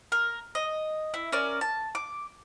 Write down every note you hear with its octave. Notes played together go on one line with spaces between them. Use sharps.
A#4
D#5
E4
C#4 A#4 D5
A5
D6